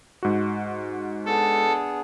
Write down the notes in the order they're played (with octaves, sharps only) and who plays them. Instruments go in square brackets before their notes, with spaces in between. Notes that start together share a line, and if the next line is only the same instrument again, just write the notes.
[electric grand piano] G#2 F#4
[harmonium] B3 D4 G#4 [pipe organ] A4